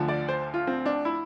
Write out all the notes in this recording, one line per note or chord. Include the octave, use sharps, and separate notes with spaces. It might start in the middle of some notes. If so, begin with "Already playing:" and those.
Already playing: D2 D3 F3
D5
C5
F4
C4
D4
E4